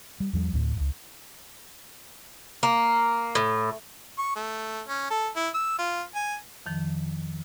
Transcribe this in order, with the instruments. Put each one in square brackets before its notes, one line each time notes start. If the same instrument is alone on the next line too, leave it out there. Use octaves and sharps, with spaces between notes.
[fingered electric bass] G3
E2 F3 G3
D2 A2
D1 C#2
[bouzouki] A#3
A2
[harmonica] C#6
A3
C#4
A4
E4
E6
F4
G#5
[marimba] F2 D#3 F3